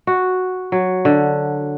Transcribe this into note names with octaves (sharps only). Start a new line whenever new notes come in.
F#4
F#3
D3